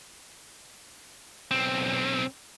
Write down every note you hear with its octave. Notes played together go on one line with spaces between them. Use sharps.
B1 C4